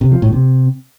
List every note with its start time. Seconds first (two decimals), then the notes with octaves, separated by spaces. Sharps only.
0.01 C3
0.12 F3
0.22 A2
0.33 C3